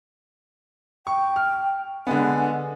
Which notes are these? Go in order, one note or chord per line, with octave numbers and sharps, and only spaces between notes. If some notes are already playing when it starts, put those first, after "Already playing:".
G5 C#6
F6
D3 G#3 B3 G#5